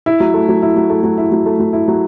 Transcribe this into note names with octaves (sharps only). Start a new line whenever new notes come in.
E4
F#3
A3
F#3
E4
F#3
A3
F#3
E4
F#3
A3
F#3
E4
F#3